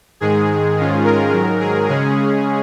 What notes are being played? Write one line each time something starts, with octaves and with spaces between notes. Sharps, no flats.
G#2 D#3 G#3 G#4
G#2 D#3 G#3 C#4 F4
A#4
G#2 D#3 F#3
G#4
C#3 G#3 C#4 G#4